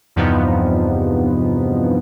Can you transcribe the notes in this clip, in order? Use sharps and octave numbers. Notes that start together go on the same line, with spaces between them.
E2 G2 C3 F3 B3 D#4